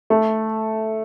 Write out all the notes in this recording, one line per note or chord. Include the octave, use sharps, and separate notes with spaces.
A3